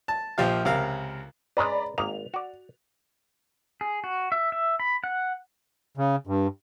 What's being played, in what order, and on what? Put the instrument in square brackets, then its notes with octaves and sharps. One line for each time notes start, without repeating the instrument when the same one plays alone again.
[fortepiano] A5
A#1 F3 G4 F5
C#2 C3 A#4 F5
[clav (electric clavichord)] G#3 C#4 B4 [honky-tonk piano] D5 A#5 B5
[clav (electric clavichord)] G#1 A#3 D#5 [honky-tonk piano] F7
[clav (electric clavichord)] F#4 D5
[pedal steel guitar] G#4
F#4
E5
E5
B5
F#5
[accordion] C#3
G2